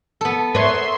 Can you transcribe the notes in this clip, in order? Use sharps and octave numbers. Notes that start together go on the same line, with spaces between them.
B3 A4
A#4 B4 C#5 E5 C6